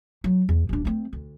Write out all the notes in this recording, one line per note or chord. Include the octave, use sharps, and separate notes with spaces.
F#3
E2
D#1 D4
A3 C4
D2